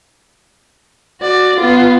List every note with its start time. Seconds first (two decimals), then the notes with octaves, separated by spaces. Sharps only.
1.21 F#4 D5
1.57 B3 F4